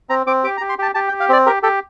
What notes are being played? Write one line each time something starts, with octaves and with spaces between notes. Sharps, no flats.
C4 A#5
C4 D6
G4 D6
A#5
G4
C6
G4 A5
G4 A5
G5
G4
F5
C4 D5
G4 A#4
G4 A4